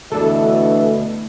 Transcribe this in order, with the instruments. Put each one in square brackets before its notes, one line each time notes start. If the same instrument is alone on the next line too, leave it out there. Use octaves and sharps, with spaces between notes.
[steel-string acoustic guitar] D2 [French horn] B2 [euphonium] E3 [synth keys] D4 A4